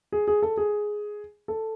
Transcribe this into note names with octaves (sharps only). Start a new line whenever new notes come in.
G#4
G#4
A4
G#4
A4